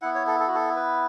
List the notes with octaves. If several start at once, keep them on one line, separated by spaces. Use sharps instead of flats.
B3 E4 F#5
C#5
A4
A4
F#4
A4
B4